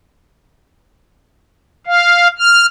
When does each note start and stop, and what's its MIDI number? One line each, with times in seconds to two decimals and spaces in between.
1.86 2.28 77
2.38 2.66 89